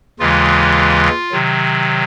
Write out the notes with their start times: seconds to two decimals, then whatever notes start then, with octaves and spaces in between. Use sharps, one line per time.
0.19 D#2 C#3 E3 G#3 F4
1.31 C3 D#3 F#3